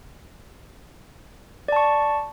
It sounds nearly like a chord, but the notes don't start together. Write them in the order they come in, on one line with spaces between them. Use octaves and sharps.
D5 A5 C#6